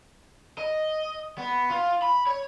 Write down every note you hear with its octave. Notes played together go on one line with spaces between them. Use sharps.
D#5
B3
F4
B5
C#5